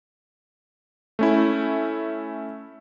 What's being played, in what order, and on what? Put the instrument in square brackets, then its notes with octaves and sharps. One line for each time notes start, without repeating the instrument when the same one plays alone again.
[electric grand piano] A3 C#4 E4